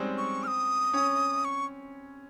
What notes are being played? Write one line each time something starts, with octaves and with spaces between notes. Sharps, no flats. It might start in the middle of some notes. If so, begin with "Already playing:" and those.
Already playing: G3 G#3 C4 C#4 D#4
C#6
F6
D#6
C#4
C#6